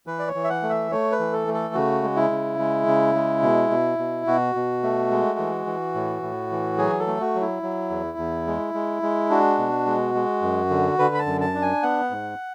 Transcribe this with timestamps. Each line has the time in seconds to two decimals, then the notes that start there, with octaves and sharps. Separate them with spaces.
0.07 E3 B4
0.19 D5
0.28 C#5
0.35 E3
0.44 E5
0.49 F#5
0.63 A3
0.69 E5
0.92 A3 C#5
1.12 B4
1.19 E3
1.33 A4
1.47 A3
1.54 A4
1.74 C#3 F#4
2.03 G#3
2.16 E4
2.31 C#3
2.59 G#3
2.87 C#3
3.15 G#3
3.42 B2
3.70 B2
3.99 B2
4.27 B2 F#4
4.55 B2
4.83 A3
5.11 G#3
5.39 E3
5.66 E3
5.95 A2
6.22 A2
6.51 E3
6.78 F#3 G#4
7.00 A4
7.07 A3
7.21 F#4
7.35 F#3
7.41 E4
7.63 F#3
7.90 E2
8.18 E2
8.47 G#3
8.74 G#3
9.02 G#3
9.30 D4 F#4
9.58 B2
9.86 G#3
10.15 G#3
10.42 F#2
10.70 D3
10.99 D3 B4
11.14 B5
11.19 A5
11.26 F#2
11.41 A5
11.54 D4
11.62 G#5
11.82 B3 F#5
12.11 G#2